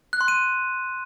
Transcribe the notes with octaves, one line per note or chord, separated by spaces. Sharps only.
F#6
C6
D#7